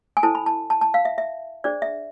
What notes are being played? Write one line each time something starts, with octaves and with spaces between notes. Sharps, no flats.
G#5
E4 A4 C5 A5
B5
A5
A5
A5
F5
E5
E5
D4 G#4 C5 D5
E5